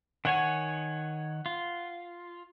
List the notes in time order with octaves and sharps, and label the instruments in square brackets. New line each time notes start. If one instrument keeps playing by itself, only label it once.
[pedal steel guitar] D#3 C#5 G#5 [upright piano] F#5
[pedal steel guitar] F4